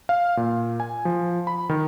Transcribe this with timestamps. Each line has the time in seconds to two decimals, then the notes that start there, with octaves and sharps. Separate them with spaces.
0.09 F5
0.37 A#2
0.80 G#5
1.05 F3
1.47 B5
1.69 D#3